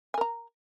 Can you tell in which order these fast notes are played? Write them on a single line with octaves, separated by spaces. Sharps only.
G#5 A#4 A#5